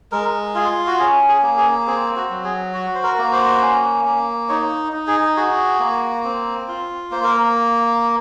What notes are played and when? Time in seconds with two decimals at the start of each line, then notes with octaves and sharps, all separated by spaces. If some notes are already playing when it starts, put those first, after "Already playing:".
0.12 G#3 A#4
0.55 F4 G#4
0.87 F#4
0.98 C#4 G#4
1.29 G#4
1.42 A#3
1.57 G#4
1.87 C4 G#4
2.16 F#4
2.30 F#3
2.44 G#4
2.74 F#4
2.95 C5
3.03 A#4
3.18 A#3
3.32 C5
3.61 C#4
4.05 A#3
4.49 D#4 C#5
4.92 D#4
5.07 G#4
5.37 F#4 G#4
5.80 A#3
6.24 C4
6.68 F4
7.11 A#3 C5
7.24 A#4